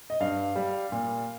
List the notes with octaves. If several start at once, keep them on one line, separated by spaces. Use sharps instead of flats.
D#5
G2 F5
G3
A#2